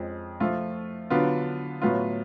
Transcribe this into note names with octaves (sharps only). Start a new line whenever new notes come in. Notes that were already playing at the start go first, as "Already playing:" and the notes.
Already playing: F2 F3 G#3 C#4
F3 A3 F4
D3 F#3 B3 F4
A2 F#3 B3 F4